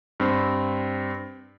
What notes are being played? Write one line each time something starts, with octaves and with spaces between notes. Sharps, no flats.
G2 C4